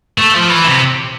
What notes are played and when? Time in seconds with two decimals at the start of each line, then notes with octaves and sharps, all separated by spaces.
0.18 A3
0.34 F3
0.50 E3
0.65 C3